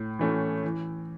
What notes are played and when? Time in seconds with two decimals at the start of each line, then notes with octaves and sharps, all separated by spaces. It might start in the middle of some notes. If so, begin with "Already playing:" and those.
Already playing: A2
0.19 E3 A3 C#4
0.64 E3